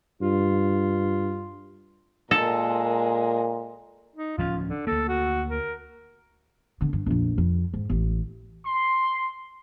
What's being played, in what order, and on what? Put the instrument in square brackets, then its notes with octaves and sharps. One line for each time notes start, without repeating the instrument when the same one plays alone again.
[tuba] G2 [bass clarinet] F4
[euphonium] A#2 [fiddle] G#3 A#4 [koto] A4
[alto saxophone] D#4
[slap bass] D1 F3 C#4 [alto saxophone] F4
[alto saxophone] D3
[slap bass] D2 A#3 [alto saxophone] A4
[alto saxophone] F#4
A#4
[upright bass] D3 B3
G2
A#1 F2
F2
G#2
A1
[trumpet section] C6